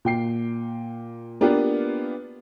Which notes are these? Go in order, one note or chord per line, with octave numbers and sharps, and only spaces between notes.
A#2 G5 C7
A#3 B3 D4 F4 G4 B4